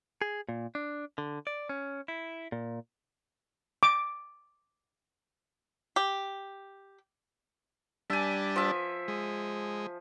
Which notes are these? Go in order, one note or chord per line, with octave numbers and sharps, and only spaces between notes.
G#4
A#2
D4
D3
D5
C#4
E4
A#2
D6
G4
G3 D4 E5 G#5 A5
F3 E5
G#3